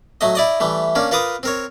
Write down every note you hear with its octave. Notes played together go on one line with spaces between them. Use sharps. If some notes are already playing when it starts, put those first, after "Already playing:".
F#3 A3 D#5
E4 D5 D#5
E3 G3 A3
A#3 C#4 D4
F4 A#4 B4 D6 D#6
C4 A#4 C#5